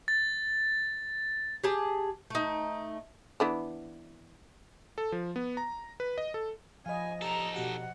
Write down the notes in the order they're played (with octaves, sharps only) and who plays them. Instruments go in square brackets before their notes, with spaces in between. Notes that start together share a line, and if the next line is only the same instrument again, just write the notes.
[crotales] A6
[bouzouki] G4 G#4 A5
A3 D#4
[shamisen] E3 B3 D4
[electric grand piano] A4
F3
B3
A#5
B4
D#5
A4
[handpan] F3 D#5 [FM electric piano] F5 B5 [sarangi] G#5
[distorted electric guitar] D#4 A4 [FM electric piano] G4 D#6 [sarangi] A#5
[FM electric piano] B2 F#4 G4 [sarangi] F#5